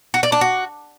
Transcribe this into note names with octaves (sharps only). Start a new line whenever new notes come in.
F#4
D5
D4
F#4